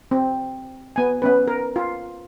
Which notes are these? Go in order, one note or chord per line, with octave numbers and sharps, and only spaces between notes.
C4
B3 G#5
B3 C#4 B4
A#4
F4